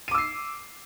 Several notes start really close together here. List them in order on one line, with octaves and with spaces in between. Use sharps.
D#7 D6 E6 C7